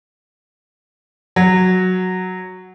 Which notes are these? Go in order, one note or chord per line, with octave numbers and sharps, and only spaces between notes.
F#3